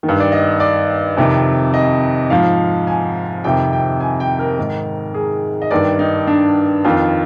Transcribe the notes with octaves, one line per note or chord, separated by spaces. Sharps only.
D#3
G2
D5
D#5
D5
F2 C3 D#3
D#5
G#2 F3 F5
G#5
F2 C3 D#3 G5
G5
G#5
G5
A#4
G#2 D#3
G#4
D#5
G2 D#3 D5
D#4
D4
F2 D#3 F4